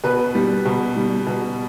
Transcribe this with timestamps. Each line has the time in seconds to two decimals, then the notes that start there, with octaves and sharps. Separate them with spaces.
0.04 B2 B4
0.35 G3
0.66 B2
0.96 G3
1.27 B2